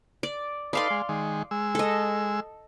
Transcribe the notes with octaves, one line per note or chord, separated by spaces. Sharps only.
D5
D#4 A4 B4 D5 F5 C6
G#3
D#3 G#3
G#3 E6
A4 D#5